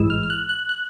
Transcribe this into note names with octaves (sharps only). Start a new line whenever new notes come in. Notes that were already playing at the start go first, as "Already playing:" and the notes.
Already playing: A1 G#2 E3 G#3 E6
F6
F6
F#6
F#6
F#6